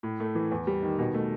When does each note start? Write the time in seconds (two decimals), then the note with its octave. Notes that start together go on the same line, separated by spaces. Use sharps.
0.03 A2
0.20 A3
0.35 E3
0.52 E2
0.67 G3
0.83 D#3
0.99 B2
1.14 A3